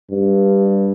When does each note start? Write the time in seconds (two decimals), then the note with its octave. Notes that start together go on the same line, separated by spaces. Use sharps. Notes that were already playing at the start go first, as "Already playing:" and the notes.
0.11 G2